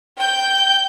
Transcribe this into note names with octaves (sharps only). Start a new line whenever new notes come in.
G5 G6